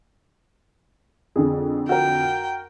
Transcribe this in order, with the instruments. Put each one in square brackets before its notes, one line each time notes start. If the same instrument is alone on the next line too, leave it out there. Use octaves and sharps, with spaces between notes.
[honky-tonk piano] F2 D3 [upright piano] G#4
[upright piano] F#4 A#4 [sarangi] G5